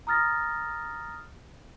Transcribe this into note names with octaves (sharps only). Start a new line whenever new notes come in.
A#5 D#6 F6 A6 A#6